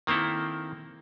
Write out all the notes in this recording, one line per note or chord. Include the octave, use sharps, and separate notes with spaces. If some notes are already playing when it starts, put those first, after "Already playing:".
D#3 A#3 C4 E4 A4